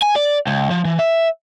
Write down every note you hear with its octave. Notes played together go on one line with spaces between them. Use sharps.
G#5
D5
C#2
F3
E3
E5